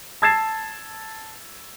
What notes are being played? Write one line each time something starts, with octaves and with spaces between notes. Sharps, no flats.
A5 E6 G#6 A6 C7 E7